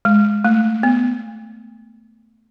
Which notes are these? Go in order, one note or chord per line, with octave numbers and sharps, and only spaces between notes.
G#3
A3
B3